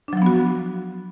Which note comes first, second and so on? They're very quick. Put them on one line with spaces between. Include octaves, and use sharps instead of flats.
D4 F#3 F3 B3 F#4